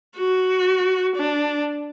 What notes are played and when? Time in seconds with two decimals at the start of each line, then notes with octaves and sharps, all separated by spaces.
0.17 F#4
1.16 D4